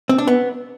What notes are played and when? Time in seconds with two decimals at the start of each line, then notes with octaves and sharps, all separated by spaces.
0.09 C4
0.18 D4
0.27 B3